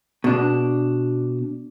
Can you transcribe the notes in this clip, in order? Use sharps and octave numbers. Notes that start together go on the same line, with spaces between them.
B2 D4